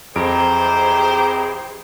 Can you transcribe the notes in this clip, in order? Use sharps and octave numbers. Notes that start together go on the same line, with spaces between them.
F2 E3 G4 G#4 C5 A#5 D7